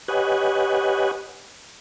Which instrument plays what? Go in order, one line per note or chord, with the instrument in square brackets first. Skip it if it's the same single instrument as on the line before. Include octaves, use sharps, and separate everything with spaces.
[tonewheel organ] G4 B4 C#5 D#5 F#5 G#5